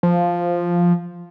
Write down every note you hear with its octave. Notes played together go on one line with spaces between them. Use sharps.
F3